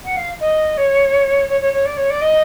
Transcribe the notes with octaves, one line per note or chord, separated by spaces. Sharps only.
F#5
F5
D#5
C#5
C#5
C#5
C#5
D5
C#5
D5
D#5